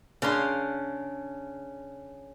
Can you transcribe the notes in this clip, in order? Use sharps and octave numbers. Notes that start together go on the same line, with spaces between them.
C#3 C#4 D4 C6